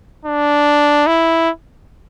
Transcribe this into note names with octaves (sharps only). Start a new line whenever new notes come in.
D4
E4